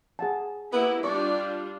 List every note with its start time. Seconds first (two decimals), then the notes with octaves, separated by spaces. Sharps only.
0.19 G#4 F#5 A5
0.73 A#3 B3 E4 G4
1.04 G3 D4 F4 D5 C#6